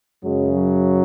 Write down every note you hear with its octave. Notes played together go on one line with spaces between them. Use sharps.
F#2 C#3 F#3 G#3
F#3